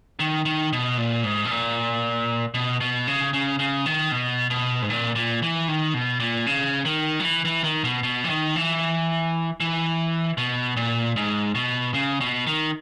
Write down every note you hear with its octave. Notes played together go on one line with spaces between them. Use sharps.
D#3
D#3
B2
A#2
G#2
B2
A#2
B2
B2
C#3
C#3
C#3
D#3
B2
B2
G#2
A#2
A#2
E3
D#3
B2
A#2
C#3
D#3
F#3
E3
E3
D#3
B2
B2
E3
D#3
E3
E3
B2
A#2
G#2
B2
C#3
B2
D#3